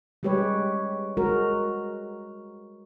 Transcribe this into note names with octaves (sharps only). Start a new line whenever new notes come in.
G3 G#3 G4 B4 C#5
G#3 F#4 A#4